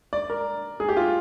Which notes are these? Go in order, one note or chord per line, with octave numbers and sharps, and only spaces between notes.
D5
A#4
G#4
G4
F4